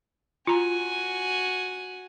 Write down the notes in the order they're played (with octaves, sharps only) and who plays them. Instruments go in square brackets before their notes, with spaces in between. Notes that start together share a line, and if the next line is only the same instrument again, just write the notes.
[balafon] F4 A#5 [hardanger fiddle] F#4 G#5